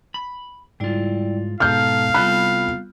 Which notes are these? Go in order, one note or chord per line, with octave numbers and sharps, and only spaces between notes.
B5
G#2 G3 E4 F4 D5
G#2 B2 A4 F5 A5 A#5 F6 G6
C2 C3 G3 B3 F4 A4 B5 F#6